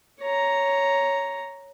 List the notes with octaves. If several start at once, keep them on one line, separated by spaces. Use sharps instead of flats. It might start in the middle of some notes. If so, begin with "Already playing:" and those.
C#5 A#5